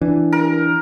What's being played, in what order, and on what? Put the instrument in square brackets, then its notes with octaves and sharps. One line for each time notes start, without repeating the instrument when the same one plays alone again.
[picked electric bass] E3 [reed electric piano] D4
[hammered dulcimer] A#4